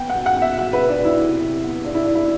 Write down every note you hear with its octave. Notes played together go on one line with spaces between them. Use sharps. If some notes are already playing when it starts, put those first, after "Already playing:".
Already playing: B3 G5
F#5
B2
F#5
B2 E5
B2 F#5
B4
B2
D4
B2 E4
C3
C3
B3
C3 D4
E4
B3 D4
E4